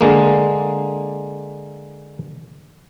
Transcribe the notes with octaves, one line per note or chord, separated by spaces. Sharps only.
D3 G#3 A#3